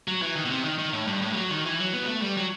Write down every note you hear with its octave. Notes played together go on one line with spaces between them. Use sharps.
F#3
E3
D#3
B2
C3
D#3
D#3
A2
G2
A2
G3
F#3
D#3
E3
F#3
B3
G3
A3
G3
F#3